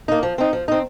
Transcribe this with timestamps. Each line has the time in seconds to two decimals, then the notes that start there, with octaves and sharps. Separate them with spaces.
0.08 A#3 D#4
0.23 F3
0.38 C4 D#4
0.53 F3
0.68 C4 D#4